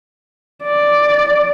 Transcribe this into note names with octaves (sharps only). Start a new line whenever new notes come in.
D5